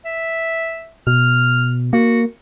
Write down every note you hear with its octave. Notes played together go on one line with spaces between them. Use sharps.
E5
B2 F6
A#3 F#4